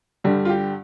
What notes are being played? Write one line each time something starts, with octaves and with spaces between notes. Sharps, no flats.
G2 D3 G3 G4
F4
G4